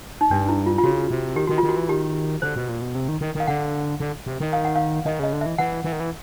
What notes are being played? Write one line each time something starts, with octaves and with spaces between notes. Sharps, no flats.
D#4
G2 D4
E4
F4
F4
C#3 F#4
C3
D#3 G4
D#3 F#4
F4
D#3
F#4
E3
D#3 G4
D3 C5
B2
A#2
B2
C3
D#3
D#3
D#3
F5
D3 F#5
D3
C3
D#3
F5
F#5
F5
D#3 D#5
C#3 D#5
D3
E3 E5
E3 F#5
E3
D#3
E3